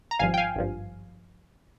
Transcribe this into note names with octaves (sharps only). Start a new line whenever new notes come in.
A#5
G#1 G2 F3 F5 G#5
G5
F5 G#5
G#1 G2 F3